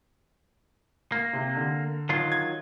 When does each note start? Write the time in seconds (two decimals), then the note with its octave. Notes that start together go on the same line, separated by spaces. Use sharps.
1.12 A#3
1.33 C3
1.56 D3
2.09 D#3 F#3 F4
2.32 G#6